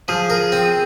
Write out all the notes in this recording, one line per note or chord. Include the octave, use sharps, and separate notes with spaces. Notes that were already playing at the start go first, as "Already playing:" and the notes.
F3 G#4
A#4
C4